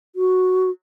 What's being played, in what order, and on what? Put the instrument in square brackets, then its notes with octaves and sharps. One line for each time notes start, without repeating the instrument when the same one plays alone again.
[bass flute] F#4